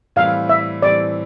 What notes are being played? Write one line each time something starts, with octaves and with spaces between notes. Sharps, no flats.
A2 E3 G3 C4 E4 F5
E5
A2 E3 G3 C4 E4 D5